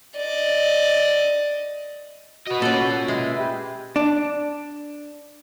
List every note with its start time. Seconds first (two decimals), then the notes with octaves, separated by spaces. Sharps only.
0.17 D5 D#5
2.47 F#4 B4 D#5
2.62 A#2 C#4 A4 D5
3.08 G#3 E5
3.38 G4
3.96 D4